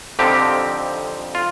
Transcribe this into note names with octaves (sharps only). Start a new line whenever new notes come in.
F2 D3 F3 C4 D#4 G4
F4